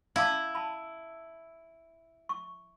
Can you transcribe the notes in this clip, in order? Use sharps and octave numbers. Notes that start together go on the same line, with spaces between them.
E4 F5 A5 D6
A5 B5
C#6